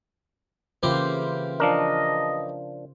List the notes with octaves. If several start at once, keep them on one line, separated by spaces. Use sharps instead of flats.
C#3 E3 A#3 F4 G4 C5
F3 D4 A#4 D#5